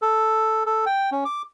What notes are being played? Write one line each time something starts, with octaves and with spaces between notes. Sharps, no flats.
A4
A4
G5
C#4
D6